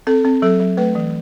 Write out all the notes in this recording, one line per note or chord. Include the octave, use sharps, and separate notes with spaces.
C4 A4
C4
F#3 A4
F#3
A3 B4
E3